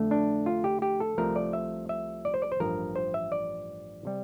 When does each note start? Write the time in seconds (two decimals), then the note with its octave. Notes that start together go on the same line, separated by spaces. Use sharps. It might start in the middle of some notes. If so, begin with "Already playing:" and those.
Already playing: F2 D3 A3
0.11 D4
0.46 F4
0.64 G4
0.82 G4
1.00 A4
1.18 C2 C3 F3 A3 A#4
1.36 D5
1.53 E5
1.89 E5
2.25 D5
2.34 C5
2.42 D5
2.52 C5
2.60 A1 G2 F3 A#4
2.96 C5
3.14 E5
3.32 D5
4.05 C3 G3